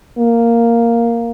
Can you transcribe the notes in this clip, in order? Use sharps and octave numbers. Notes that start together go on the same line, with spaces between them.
A#3